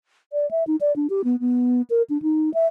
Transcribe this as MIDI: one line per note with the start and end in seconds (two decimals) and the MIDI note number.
0.33 0.49 74
0.51 0.64 76
0.67 0.76 63
0.81 0.95 74
0.96 1.07 62
1.10 1.22 67
1.24 1.40 59
1.40 1.82 59
1.90 2.02 70
2.10 2.21 62
2.22 2.52 63
2.54 2.67 76